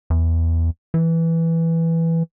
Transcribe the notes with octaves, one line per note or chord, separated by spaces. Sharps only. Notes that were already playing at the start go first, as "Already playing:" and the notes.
E2
E3